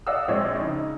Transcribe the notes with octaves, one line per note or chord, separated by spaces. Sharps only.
D5 D#5 F5 F#5 D#6 E6
A#1 G#3 C4 C#5 D5
C#3 D#4